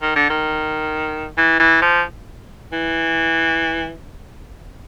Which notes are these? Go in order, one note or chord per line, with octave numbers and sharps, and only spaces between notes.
D#3
D3
D#3
E3
E3
F3
E3